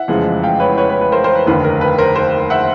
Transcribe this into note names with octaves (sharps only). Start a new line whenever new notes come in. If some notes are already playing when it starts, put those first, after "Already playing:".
Already playing: E5 F#5
F1 E2 C#3 F3 G#3
F5 G5
B4 C#5
B4 C#5
B4
B4
A#4 C5
A#4 C5
B4
F1 D#2 D3 B4
A#4
B4
A#4 C5
A#4 C5
E5 F#5